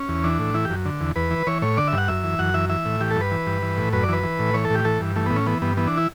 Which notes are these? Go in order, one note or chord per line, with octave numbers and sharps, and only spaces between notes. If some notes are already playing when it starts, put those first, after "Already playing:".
Already playing: C#4
E2
E3 D4
A2
E3 E4
G4
F#2
D3
E2
E2 B4
E3
E3 C#5
A2 C#5
D3 D5
G2 E5
F#5
F#2 E5
E3
F#2 F#5
E3 E5
E3 E5
A2
E3 G4
A4
G2
B4
E3
G2
E3
A2
F#2 B4
D5
E3 B4
E3
A2
E3 C#5
A4
A2 G4
E3 A4
G2
E3 A3
A2 B3
C#4
E3 B3
G2 B3
E3 B3
D4
E4